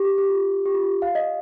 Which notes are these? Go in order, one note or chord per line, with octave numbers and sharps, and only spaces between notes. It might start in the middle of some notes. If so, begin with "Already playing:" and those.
Already playing: G4
G4
F4
G4
F4
G4
F5
D#5